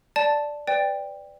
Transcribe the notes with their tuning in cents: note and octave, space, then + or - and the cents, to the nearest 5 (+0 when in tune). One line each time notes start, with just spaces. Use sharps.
D5 +0 A5 +0
B4 +35 D5 +0 G5 +15